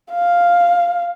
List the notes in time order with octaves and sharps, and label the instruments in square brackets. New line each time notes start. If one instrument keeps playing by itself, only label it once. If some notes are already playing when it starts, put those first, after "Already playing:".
[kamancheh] F5